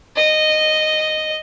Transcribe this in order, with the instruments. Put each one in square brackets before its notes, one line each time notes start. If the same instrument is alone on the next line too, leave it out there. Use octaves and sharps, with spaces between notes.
[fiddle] D#5